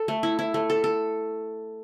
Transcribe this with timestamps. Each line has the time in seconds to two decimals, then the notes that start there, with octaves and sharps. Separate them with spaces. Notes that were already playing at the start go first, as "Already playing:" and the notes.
Already playing: A4
0.08 A3
0.23 E4
0.39 E4
0.54 A3
0.70 A4
0.84 A4